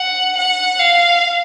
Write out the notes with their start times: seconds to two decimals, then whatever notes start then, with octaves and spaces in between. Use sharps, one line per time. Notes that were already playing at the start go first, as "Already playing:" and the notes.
Already playing: F#5
0.37 F#5
0.80 F5